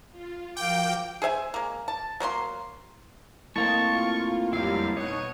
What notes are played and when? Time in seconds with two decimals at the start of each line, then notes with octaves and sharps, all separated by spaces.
0.12 F4
0.57 F3 F#4 A#4 F5 G5 D6
1.22 G#4 C5 E5 G#5
1.54 G#3 A#3
1.88 A5
2.20 F#3 A#3 A#4 C6
3.56 A2 A#3 C4 D#5 A5 C#6 A6
3.90 F4
4.53 F2 D3 F#3 G3 E4 F5
4.97 B2 D#4 C#5 F#5 C#6 D#7